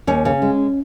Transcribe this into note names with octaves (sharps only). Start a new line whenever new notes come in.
D#2 C#4
C#3
G#3